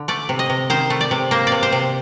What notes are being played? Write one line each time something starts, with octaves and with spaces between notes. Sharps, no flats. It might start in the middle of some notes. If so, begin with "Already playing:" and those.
Already playing: D3
A3 D5
C3
D#5
C3
D#3 C5
A3
D5
C3
A#3 C5
D5
C3
C5
C3